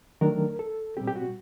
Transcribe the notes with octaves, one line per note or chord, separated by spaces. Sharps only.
D#3 F#3 A3 D4 A#4
A4
A#2 G3 C4 G4
G4
F#4